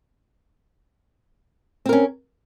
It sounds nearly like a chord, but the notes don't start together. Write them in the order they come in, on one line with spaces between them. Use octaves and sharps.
C4 A#4 C#4